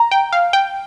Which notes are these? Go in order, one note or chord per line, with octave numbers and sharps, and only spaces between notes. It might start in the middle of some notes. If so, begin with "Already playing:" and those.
Already playing: A#5
G5
F5
G5